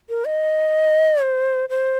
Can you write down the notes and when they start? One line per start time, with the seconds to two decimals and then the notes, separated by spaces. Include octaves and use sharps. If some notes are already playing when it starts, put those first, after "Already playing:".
0.09 A#4
0.25 D#5
1.22 C5
1.69 C5